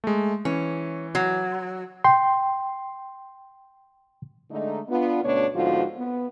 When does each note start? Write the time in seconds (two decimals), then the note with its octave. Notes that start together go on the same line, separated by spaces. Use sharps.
0.04 G#3 A3
0.45 E3 C#4
1.15 F#3
2.04 G5 C6
4.50 D3 G#3 A3 D#4
4.89 B3 D4 F4
5.23 D2 B2 A3 C#4 D4 C#5
5.54 G#2 D3 F3 B3 F4 F#4
5.97 B3